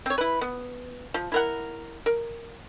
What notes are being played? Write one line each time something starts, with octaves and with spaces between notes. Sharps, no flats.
C4 C#5
E4 B4
B3
F3
E4 A#4 F#5
A#4